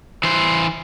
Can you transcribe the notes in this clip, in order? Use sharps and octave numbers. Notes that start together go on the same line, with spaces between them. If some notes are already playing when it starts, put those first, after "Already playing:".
E3 C5